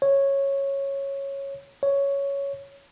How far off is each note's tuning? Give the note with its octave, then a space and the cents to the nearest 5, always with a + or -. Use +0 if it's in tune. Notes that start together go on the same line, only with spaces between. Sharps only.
C#5 -10
C#5 +5